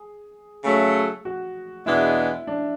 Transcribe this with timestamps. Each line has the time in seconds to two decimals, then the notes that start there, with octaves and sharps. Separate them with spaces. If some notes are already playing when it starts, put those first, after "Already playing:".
Already playing: G#4
0.64 C#3 F#3 A3
1.25 F#4
1.86 E2 B2 G#3 B3 D4 E4
2.47 D4